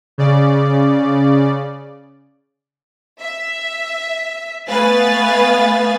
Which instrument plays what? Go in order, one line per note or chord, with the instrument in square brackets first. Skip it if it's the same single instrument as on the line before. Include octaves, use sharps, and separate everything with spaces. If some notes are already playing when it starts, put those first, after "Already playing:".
[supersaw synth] C#3 D5
[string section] E5
A3 B3 B4 F5 G#5 A6